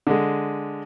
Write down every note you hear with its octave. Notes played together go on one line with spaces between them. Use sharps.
D3 G#3